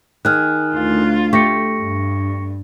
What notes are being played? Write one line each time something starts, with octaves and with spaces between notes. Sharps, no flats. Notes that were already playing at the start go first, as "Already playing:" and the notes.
D#3 G#4 F6 F#6
D2 F4
A3 G4 C#6 A#6 C#7
G2